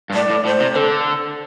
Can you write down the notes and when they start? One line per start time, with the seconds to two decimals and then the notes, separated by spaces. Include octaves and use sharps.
0.10 G2
0.14 A2 D5
0.30 A2
0.45 A2 C5
0.60 C3
0.76 D3 A4